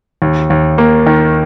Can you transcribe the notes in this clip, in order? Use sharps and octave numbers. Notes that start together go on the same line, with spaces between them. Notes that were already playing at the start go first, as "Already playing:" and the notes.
D#2
D#2
A#3
D#3